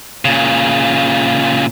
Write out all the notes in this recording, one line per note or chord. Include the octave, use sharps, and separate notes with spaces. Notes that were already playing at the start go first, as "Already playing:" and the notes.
A#2 C#3